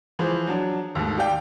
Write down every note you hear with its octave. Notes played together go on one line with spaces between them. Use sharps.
E3 F3 G#4 C5
F#3 D4
D#2 G#2 A3
G4 D5 F5 G5